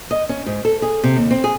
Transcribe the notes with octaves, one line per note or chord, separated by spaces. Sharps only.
D#5
C#4
G#2
A4
G#4
C3
D#2
C4
G#4